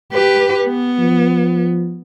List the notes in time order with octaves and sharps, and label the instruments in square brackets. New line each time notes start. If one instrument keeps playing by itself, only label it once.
[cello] G4 B4
B3
[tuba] F3